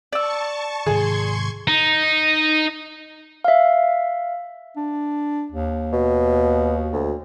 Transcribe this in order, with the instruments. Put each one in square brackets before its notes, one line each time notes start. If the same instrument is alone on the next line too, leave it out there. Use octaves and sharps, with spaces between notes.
[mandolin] D5 E6 [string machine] A5 C#6
[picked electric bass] G#2 C3 D#3 [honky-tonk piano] G#4 [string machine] C6 C#6 G#6
[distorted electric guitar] D#4
[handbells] E5 F5
[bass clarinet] D4
D#2
[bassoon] B2
D2